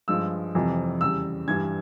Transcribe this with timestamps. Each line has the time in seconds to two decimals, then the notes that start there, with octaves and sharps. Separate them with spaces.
0.08 G2 F3 G#3 E6
0.55 F2 C3 E3 G3
1.01 E2 C#3 G3 E6
1.48 G2 E3 G3 G#6